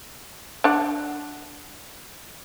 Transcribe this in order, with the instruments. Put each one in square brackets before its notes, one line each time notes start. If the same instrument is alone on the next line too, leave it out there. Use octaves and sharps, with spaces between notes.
[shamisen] D4 F#5